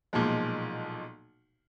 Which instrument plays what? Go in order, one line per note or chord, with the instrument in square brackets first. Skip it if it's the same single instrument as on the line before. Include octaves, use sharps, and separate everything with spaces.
[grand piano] B1 A#2 F3 G#3